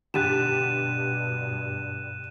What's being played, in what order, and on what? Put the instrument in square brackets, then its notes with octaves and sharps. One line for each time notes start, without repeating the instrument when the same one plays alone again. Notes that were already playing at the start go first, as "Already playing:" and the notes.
[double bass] G2 B2 [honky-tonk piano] D3 G4 A6 [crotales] F#6 D#7 E7